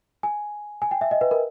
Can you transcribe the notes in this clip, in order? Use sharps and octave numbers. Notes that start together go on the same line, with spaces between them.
G#5
G#5
G5
E5
D#5
B4
A#4